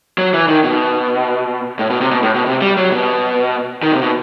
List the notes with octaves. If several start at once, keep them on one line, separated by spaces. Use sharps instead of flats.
F#3
E3
D#3
B2
A2
B2
C3
B2
A2
B2
C3
G3
F#3
B2
D#3
C3
B2